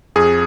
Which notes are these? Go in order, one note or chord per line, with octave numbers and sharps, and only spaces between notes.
F2 G#4